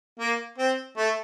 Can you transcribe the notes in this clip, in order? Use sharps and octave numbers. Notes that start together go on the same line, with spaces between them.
A#3
C4
A3